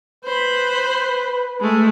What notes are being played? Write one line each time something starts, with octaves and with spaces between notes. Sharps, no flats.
B4 C5 B5
G#3 A3